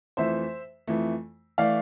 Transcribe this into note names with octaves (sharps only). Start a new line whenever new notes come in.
F2 E3 A3 C5 E5
F2 E3 A3
E3 A3 D5 F5